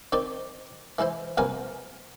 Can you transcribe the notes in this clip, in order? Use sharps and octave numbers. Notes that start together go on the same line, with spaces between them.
D#3 C4 D#4 D5
E3 G#3 E4 C5
A#1 G2 C3 B3 A#4 G#5